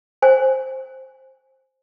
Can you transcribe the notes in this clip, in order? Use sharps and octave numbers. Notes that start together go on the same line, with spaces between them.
C5 G#5